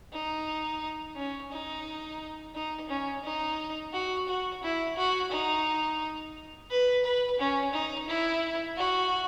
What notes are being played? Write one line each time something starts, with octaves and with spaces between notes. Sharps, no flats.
D#4
C#4
D#4
D#4
C#4
D#4
F#4
F#4
E4
F#4
D#4
B4
B4
C#4
D#4
E4
F#4